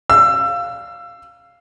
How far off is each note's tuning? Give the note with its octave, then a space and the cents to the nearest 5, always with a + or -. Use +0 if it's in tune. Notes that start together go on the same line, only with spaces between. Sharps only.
F5 +0 E6 +25